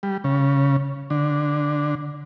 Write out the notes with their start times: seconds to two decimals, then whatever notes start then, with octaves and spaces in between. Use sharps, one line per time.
0.03 G3
0.24 C#3
1.10 D3